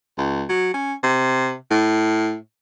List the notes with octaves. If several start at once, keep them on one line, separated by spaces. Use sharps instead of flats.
C#2
F#3
C#4
C3
A2